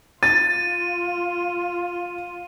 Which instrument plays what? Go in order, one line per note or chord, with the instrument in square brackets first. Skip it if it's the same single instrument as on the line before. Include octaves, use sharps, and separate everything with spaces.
[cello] F4 [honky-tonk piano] A6 [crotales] D#7